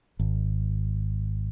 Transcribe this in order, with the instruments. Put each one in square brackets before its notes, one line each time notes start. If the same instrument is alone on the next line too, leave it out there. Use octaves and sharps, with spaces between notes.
[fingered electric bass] G#1